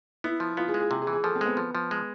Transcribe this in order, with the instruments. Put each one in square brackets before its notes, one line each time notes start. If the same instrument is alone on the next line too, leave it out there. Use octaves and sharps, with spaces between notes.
[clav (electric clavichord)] B3 [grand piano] E4
[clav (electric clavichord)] F3
[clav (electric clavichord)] B3 [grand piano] F4
[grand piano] G#4
[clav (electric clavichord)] G#3
[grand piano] G#4
[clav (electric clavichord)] C3 [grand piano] G#4
[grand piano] G#4
[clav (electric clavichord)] E3
[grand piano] G#4
[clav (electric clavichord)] F3 [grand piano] A4
[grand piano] C4
[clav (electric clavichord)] G#3 [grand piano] B3
[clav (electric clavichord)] F3
F3
G#3